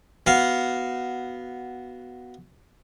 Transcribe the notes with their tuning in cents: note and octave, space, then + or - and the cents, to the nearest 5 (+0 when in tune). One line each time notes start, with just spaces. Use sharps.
B3 +0 F#4 +5 F5 +0